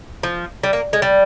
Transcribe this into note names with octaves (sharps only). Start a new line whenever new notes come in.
F3
G3
A#3
G#3
G3